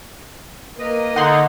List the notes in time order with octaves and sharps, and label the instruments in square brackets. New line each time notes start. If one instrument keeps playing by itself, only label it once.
[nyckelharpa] A#3 [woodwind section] A#4 B4 D#5
[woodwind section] D3 [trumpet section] D#4 [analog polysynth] F#5 C6